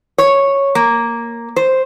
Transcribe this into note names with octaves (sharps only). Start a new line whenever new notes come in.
C#5
A#3
C5